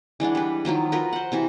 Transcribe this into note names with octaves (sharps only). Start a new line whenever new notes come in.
E3 G#3 D4 F#5
G3 B4
D#3 F3 F#3 F4
F4 F#4 A#4 B4
C5 F#5
C3 E3 F#4